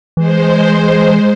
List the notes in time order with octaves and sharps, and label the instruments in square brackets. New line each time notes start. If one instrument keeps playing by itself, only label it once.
[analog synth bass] E3 [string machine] G#3 C5